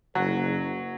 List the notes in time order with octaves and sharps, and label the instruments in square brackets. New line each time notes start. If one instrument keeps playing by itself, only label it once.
[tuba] F#1 [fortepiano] F#3